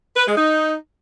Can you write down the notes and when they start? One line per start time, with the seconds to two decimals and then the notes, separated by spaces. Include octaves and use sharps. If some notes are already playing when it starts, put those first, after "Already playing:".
0.16 B4
0.26 G#3
0.36 D#4